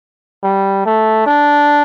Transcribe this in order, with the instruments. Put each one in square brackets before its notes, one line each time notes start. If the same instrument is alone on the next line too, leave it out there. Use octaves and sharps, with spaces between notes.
[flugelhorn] G3
A3
D4